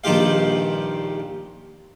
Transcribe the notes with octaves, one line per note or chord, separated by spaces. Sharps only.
A#1 G2 D#3 F4 G4 F5